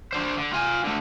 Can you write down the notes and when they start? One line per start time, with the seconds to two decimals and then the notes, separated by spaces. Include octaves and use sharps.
0.13 D4 C5
0.37 D3
0.53 F4 G#5
0.84 D3 A3